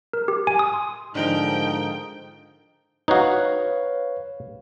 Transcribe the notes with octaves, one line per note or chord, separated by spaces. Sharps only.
A#4
G4
G#5
D#6
C6
G#2 D3 F3 D#4 A#4 G5
D#4 F#4 B4 C#5 F5